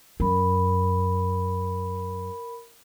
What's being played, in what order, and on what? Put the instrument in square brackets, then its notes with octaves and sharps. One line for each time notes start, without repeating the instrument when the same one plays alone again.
[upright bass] F#2 [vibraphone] A#4 B5